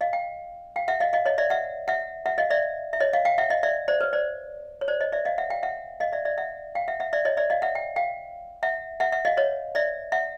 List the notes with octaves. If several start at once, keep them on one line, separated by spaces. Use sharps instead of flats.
D#5 F5
F5 G5
F5 G5
E5 F#5
D#5 F5
D#5 F5
C#5 D#5
D5 E5
E5 F#5
E5 F#5
E5 F#5
D#5 F5
D5 E5
E5
C#5 D#5
D#5 F5
F5 G5
E5 F#5
D#5 F5
D5 E5
C5 D5
B4 C#5
C5 D5
C#5
C5 D5
C#5 D#5
D5 E5
D#5 F5
E5 F#5
F5 G5
E5 F#5
D#5 F5
D5 E5
D5 E5
E5 F#5
F5 G5
E5 F#5
E5 F#5
D5 E5
C#5 D#5
D5 E5
D#5 F5
E5 F#5
G5
F5 G5
E5 F#5
E5 F#5
E5 F#5
D#5 F5
C#5 D#5
D5 E5
E5 F#5